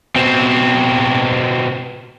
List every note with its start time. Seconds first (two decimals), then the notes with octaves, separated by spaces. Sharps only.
0.16 B2 C4